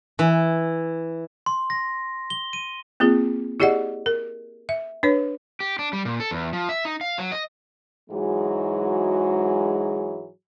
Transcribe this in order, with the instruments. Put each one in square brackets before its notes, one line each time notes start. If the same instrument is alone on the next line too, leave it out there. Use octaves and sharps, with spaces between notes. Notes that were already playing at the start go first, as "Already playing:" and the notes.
[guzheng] E3
[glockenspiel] C6
A#6
G7
D#7
[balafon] A#3 C4 F4 G#4
E4 G4 G#4 D5 D#5 F#5
A#4
E5
D4 B4 C#5
[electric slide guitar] G4
D4
G3
A#2
A4
E2
F3
E5
D#4
F5
F#3
D#5
[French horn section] G#2 E3 F#3 G#3 F#4 G#4